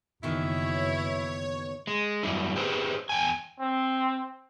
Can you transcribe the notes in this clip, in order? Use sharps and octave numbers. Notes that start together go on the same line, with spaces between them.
F#1 B2 D#3 E3 E4 C#5
G#3
F#2 G3 E4
G4 G#4 B4 C5
E2 G5 G#5
C4